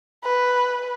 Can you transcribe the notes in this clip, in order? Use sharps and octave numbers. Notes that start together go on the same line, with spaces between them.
B4